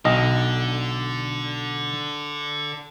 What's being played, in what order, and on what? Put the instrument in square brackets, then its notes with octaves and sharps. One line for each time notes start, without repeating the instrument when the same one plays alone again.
[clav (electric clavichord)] B1 D#5 [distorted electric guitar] D3